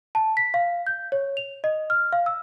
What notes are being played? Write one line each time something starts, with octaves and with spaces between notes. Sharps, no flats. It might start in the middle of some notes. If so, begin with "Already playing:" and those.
A5
B6
F5
G6
C#5
F7
D#5
F6
F5
E6